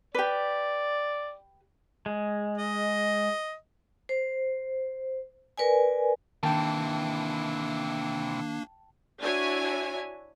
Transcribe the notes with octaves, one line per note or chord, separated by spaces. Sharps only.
G4 B4 D5
G#3
D#5
C5
A#4 B4 D5 G#5
C3 D#3 E3 A#3 D4 G5 A5
D4 E4 F#4 C#5 E5 G#5